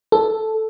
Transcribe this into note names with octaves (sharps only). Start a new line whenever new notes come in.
A4